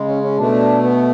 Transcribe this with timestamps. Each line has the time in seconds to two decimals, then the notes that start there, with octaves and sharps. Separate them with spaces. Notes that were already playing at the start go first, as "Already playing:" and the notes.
Already playing: C#3 G#3
0.08 C#4
0.23 C#4
0.38 B2 A3 D4
0.83 B3